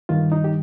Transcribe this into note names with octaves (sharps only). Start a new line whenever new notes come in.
G2 D#3 G3 F4
D#4
G4